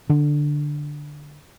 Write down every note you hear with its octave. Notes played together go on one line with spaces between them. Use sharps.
D3 D4